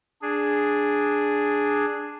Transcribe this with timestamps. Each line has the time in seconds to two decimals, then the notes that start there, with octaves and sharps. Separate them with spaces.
0.22 D4 G#4